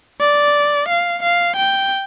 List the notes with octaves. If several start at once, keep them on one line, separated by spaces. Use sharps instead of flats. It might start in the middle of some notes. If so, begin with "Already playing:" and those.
D5
F5
F5
G5